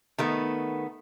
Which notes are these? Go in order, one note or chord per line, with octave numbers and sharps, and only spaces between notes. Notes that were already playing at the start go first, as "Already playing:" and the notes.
D#3 A3 B3